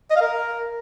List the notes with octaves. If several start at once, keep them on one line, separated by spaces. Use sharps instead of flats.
D#5
F5
A#4